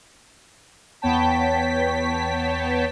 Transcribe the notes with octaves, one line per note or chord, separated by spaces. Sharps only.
E2 B3 C#5 G5 A5 B6